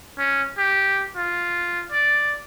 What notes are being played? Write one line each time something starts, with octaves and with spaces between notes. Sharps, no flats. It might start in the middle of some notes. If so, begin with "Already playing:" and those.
C#4
G4
F4
D5